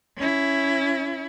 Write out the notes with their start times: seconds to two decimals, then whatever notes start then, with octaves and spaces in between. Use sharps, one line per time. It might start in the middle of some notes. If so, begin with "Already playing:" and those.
0.17 C#4 E4